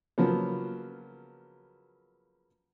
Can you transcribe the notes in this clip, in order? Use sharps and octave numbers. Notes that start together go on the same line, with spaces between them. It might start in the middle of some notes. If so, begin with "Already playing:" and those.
C#3 F3 F#3 A#3 B3